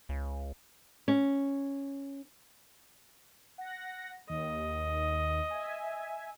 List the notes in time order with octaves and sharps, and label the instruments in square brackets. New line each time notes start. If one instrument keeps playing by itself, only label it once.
[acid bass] C#2
[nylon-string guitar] C#4
[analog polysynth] F#5 A#6
[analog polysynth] D#2 [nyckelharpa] D#5
[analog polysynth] E5 G#5